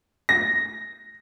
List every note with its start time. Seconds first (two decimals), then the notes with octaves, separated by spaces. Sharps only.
0.29 A#6